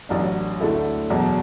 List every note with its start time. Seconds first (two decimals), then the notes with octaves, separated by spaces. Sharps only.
0.09 A1 A2 F#3 D4
0.60 D2 D3 A3 E4 A4
1.10 E2 B2 F#3